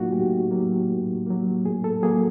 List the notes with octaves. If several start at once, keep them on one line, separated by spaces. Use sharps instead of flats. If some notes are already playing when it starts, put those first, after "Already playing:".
Already playing: A2 F#3 A#3 D#4 F4 F#4
A2 G4
F#3 A#3
A2
F#3 A#3
A2 G#4
A4
F#3 A#3 G#4